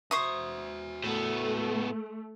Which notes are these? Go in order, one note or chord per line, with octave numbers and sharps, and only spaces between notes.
F#4 C5 E5 C#6 D#6
A2 A3 B3